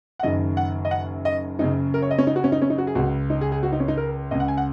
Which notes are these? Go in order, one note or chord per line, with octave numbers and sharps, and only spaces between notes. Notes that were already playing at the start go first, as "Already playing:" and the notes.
F#5
F#1 F#2 D#3 D#5
F#5
D#5
F#5
D#5
F#1 F#2 C#3 D#4
A#4
C#5
D#5
C#4
D#4
F#4
C#4
D#4
C#4
D#4
F#4
G#4
C#2 C#3 F#4
D#4
G#4
G#4
F#4
D#4
C#4
D#4
A#4
C#2 C#3 D#5
F#5
G#5
F#5